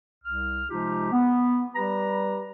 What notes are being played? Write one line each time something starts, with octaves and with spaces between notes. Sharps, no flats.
C2 F6
C3 F3 G#3 D#4 F4 G4
B3
G3 G4 B4 A#5